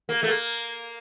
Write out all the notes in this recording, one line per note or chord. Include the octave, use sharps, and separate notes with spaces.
A#3
A3
A#3